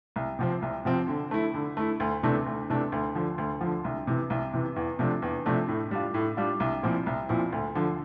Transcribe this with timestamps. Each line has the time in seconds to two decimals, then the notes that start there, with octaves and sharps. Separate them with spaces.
0.16 C2
0.39 C3 F3 C4
0.62 C2
0.85 C3 F3 C4
1.08 D3
1.31 A3 E4
1.54 D3
1.77 A3 E4
2.00 D2
2.23 C3 E3 A3 D4
2.46 D2
2.69 C3 E3 A3 D4
2.92 D2
3.15 D3 F3
3.38 D2
3.61 D3 F3
3.84 C2
4.07 C3 E3
4.30 C2
4.54 C3 E3
4.76 E2
4.99 C3 F3 A3 D4
5.22 E2
5.46 C3 F3 A3 D4
5.68 A2
5.91 G3 D4 F4
6.14 A2
6.37 G3 D4 F4
6.60 C2
6.83 A#2 F3 C4 E4
7.06 C2
7.29 A#2 F3 C4 E4
7.52 D2
7.75 D3 F3